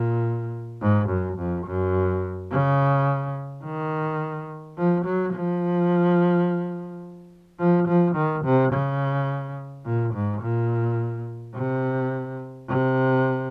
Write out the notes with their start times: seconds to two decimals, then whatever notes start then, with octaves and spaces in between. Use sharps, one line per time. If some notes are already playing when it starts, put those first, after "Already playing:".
Already playing: A#2
0.82 G#2
1.09 F#2
1.38 F2
1.67 F#2
2.51 C#3
3.64 D#3
4.77 F3
5.05 F#3
5.33 F3
7.59 F3
7.88 F3
8.16 D#3
8.45 C3
8.73 C#3
9.85 A#2
10.14 G#2
10.41 A#2
11.55 C3
12.69 C3